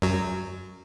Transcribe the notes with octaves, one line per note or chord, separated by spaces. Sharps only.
F#2 F#3